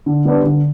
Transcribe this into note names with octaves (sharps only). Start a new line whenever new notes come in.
D3
G3 B3 D4
D3